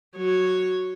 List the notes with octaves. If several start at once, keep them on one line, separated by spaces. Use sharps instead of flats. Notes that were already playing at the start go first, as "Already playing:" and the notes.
F#3 C#5